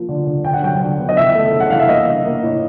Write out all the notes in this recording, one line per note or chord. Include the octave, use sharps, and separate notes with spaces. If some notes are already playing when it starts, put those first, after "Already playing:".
Already playing: F3 A#3
D3
D3
D3 G5
F#5
F#3 G5
D3
B3
D#5
E3 E5
A3
C#3
F#5
E3 F5
E5
A#3 D#5
E3
A#3
A2